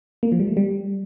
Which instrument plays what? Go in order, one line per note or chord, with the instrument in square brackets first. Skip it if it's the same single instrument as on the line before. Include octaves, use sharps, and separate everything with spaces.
[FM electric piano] A#3
F3
G3
A3
G3